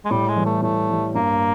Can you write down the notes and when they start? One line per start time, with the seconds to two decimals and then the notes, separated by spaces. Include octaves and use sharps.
0.05 G#3
0.11 A2 G3
0.28 G#3
0.36 E3 G3
0.46 A3
0.62 A2 A3
0.89 E3 G3
1.15 G2 A#3